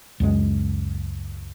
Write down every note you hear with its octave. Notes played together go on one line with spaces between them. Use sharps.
C#2 F#2 G#3